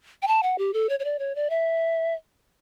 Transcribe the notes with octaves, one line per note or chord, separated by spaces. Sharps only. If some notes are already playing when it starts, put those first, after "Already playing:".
G5
A5
F#5
G4
A4
C#5
C#5
D5
C#5
D5
E5